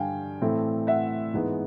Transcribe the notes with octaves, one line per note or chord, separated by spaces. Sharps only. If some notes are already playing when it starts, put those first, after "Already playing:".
Already playing: G2 D3 G3 F5 G5 G#5
A2 E3 A3 C4
E5 F#5
G#2 E3 G#3 B3